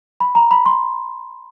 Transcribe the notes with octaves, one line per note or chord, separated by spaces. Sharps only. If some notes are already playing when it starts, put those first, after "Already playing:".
B5
A#5
B5
C6